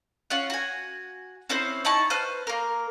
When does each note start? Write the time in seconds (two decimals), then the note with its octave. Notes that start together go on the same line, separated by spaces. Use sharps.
0.30 C#4 F4 F#5
0.50 F#4 G#5
1.49 C4 C#4 E4 C5
1.85 D#4 E4 A5 C#6
2.10 B4 C5 F6
2.47 A#3 A#4